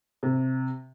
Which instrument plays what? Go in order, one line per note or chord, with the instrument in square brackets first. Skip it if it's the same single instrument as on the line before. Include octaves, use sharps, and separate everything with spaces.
[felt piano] C3